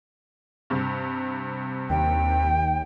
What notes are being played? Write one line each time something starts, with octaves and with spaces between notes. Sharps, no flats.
G2 C3
D#2 G5